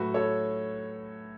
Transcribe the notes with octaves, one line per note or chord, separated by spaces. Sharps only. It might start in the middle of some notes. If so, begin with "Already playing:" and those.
Already playing: A2 F#3 F#4 A4 B4
A4 C#5